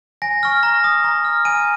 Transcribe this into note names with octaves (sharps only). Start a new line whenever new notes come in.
G#5 A#6
C#6 F6
A#5 A#6
D#6
A#5
F6
G#5 D#7